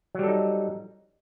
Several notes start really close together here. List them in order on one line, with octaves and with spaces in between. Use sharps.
F#3 G3 A4 D#4